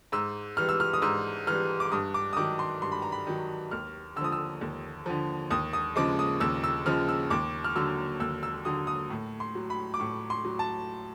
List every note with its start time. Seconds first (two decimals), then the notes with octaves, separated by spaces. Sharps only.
0.12 G#2 E6
0.57 E3 G3 F6
0.69 E6
0.80 F6
0.93 D#6
1.02 G#2 E6
1.47 E3 G3 F6
1.80 D6
1.92 G2 D#6
2.14 D6
2.33 D#6
2.37 D#3 F#3 D6
2.59 C6
2.82 G2 C6
2.92 B5
3.02 A#5
3.12 B5
3.27 D#3 F#3
3.71 D#2 F6
4.16 D3 E6
4.21 F3 D#6
4.32 E6
4.61 D#2
5.06 D3 F3
5.51 D#2 D#6
5.73 D#6
5.96 C#3 F3 G#3 D6
6.19 D#6
6.40 D#2 E6
6.64 E6
6.86 C#3 F3 G#3 F6
7.08 E6
7.30 D#2 D6
7.64 F6
7.76 D3 F#3 E6
8.20 D#2 E6
8.43 E6
8.65 D3 F#3 D#6
8.87 D#6
9.10 A2
9.40 C6
9.55 F#3
9.70 B5
9.94 D6
10.00 A2 C#6
10.30 C6
10.45 F#3
10.59 A5